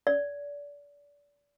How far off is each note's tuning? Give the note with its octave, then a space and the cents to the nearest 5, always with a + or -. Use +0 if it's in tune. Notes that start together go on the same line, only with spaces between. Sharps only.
D5 -30